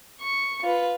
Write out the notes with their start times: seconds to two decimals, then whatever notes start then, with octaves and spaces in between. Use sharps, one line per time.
0.21 C#6
0.63 F4 B4